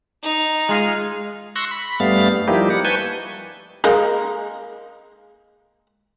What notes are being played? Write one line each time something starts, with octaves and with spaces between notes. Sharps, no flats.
D#4
G#3 F4 G#4
C6 C#6 E6 F#6 A#6
B5
G2 G3 A3 B3 F5 A6
F3 G3 A#3 D#4 E4 G4
F#5
B4 G#5 A5 C#6 G6
G#3 A#3 D#4